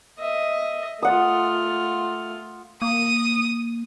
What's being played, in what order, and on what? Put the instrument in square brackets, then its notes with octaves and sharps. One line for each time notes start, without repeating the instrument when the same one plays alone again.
[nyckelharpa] D#5 E5
[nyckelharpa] A3 F4 [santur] F#5 D#6
[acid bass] A#3 [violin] D#6